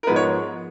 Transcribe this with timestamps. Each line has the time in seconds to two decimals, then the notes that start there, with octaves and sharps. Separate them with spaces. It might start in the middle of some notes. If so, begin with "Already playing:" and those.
0.03 A#4
0.07 G#2 F3 G#3 B3 B4
0.16 C#5